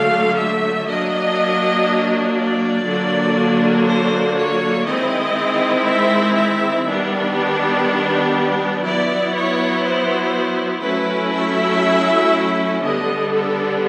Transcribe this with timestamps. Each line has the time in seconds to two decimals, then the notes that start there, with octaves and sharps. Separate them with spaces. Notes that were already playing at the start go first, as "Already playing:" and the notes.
Already playing: D3 F#3 A3 F5
0.36 E5
0.86 F#3 A#3 D4 D#5
2.35 D5
2.85 D3 F#3 A#3 D4
3.85 C5
4.35 C#5
4.85 D#3 G#3 C4 E4 D#5
5.85 E5
6.34 E5
6.84 D#3 G3 B3 D4
8.83 F#3 B3 E4 D5
9.33 C#5
9.83 C5
10.82 F#3 A3 C#4 E4 B4
11.32 E5
12.82 D3 G3 B3 D4 D#5
13.32 A4